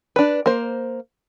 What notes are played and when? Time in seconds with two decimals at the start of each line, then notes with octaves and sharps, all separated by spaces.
0.16 D4 B4
0.46 A#3 C5